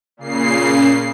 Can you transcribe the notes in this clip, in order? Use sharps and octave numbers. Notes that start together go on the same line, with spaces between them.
A#2 C#3 C7